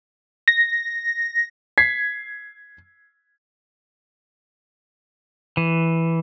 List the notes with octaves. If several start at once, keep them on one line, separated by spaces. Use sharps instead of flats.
A#6
G#6 B6 C7
E3